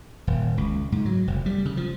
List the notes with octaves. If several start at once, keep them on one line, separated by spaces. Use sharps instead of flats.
D#1
C#2
G#2
F#3
F1
G3
C#3
F3